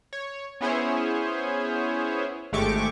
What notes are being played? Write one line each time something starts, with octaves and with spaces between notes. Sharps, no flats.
C#5
B3 C#4 E4 G#4 C5 C#5
G#1 G#3 A3 G4 C#6 D6